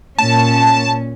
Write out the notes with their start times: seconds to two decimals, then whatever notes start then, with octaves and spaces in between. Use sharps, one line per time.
0.18 A#2 C#4 A5